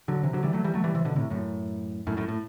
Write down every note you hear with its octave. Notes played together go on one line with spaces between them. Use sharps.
D3 F#3
C3 E3
D3 F#3
E3 G3
F#3 A3
E3 G3
F#3 A3
E3 G3
C3 E3
B2 D3
A2 C3
F#2 A2
F#2 A2
F#2 A2
A2